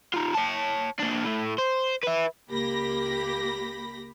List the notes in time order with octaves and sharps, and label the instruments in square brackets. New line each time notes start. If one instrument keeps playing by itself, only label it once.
[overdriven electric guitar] D#4 F4
C#5 A5
A#3 D4
A2 A3
C5
B4 E5
[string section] C#2 A#3 G4 B5 A#6